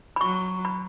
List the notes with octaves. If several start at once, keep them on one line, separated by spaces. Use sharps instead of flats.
B5
F#3 C#6
B5